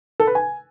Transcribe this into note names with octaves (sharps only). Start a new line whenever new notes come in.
A4
B4
G#5